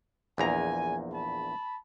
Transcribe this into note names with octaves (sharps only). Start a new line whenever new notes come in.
A#1 E2 G#5 A#5
A5 B5